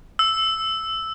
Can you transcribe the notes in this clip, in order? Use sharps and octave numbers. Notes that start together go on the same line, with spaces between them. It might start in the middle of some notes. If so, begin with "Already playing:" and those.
E6